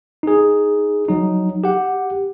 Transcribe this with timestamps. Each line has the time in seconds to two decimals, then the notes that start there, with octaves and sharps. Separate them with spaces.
0.23 D#4 G#4
1.09 F#3 D#4
1.64 G4 F#5